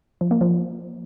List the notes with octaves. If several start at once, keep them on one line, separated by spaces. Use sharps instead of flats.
F3
A#3
F3